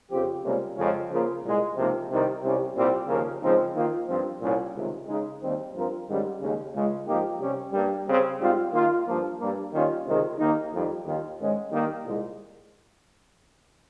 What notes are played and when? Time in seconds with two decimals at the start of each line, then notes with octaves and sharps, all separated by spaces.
0.09 F2 C#3 F3 C4 G4
0.43 C#2 C3 G3 A#3 C#4
0.76 F2 C#3 G#3 C#4
1.09 C#3 F3 A#3 F4
1.43 C2 A#2 G#3
1.75 C#2 C3 F3 A#3 D#4
2.08 C2 C3 D#3 G3
2.41 C2 C3 G3 C#4
2.75 C2 A#2 G3 C4 G4
3.08 D#2 C#3 F3 A#3
3.41 C#3 F3 G#3 C4 D#4
3.75 D#3 A#3 F4
4.07 G2 F3 C4
4.40 C2 A#2 G3 C#4
4.73 C#2 C3 D#3
5.07 C#3 G#3 D#4
5.40 D#2 D#3 G3 C4
5.73 G2 F3 C4 F4 A#4
6.07 G#2 D#3 G3 C#4
6.40 D#2 C#3 G#3
6.73 C#2 C#3 G#3
7.06 G#2 F3 A#3 D#4 G4
7.39 C3 G3 C#4 G4
7.72 G2 G3 A#3
8.06 C#3 G3 C4
8.39 G#2 G3 C4 F4
8.72 D#3 A#3 F4
9.05 G2 F3 A#3
9.38 G2 G3 A#3
9.72 D#2 D#3 G3 C#4 F4
10.05 C#2 C3 D#3 G#3
10.37 D#2 D#3 A#3 D#4
10.71 F2 D#3 G3
11.04 D#2 D#3 A#3 F4
11.37 G#2 D#3 G#3 C#4
11.70 D#3 G3 A#3
12.04 C2 A#2 G#3